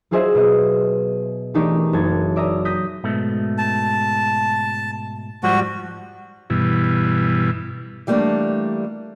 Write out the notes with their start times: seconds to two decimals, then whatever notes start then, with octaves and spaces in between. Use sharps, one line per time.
0.11 F#3 F4 G#4 C5 D#5 E5
0.35 B2 D#5
1.54 E3 A3 D4 D#4 G4 A#4
1.93 F#1 A4 G#6 A6
2.36 D5 E5 A#5 D#6
2.65 D#6 G6 A#6 B6
3.04 G#2 B2 A3
3.58 A5
5.43 G#2 F3 G3 F#4
6.50 G2 B2 E3
8.07 E3 G3 A3 A#3 D4